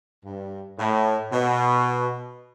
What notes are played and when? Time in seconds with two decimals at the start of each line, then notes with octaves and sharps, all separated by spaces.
0.25 G2
0.79 A2
1.32 B2